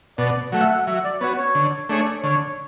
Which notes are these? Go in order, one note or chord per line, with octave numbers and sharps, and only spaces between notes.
B2 D5
F#3 A3 F#5
E5
F#5
F#3 E5
D5
B3 F#4 C#5
C#5
D3
A3 D4 G#4 C#5
D3 C#5